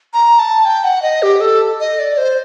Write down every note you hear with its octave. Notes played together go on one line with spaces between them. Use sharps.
A#5
A5
G5
F#5
D#5
G4
A4
D#5
D5
C5